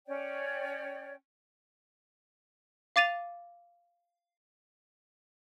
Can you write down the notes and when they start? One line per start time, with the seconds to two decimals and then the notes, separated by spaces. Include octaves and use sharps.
0.07 C#4 C#5 D5 G5
2.96 F5 D6 A6 D#7 F7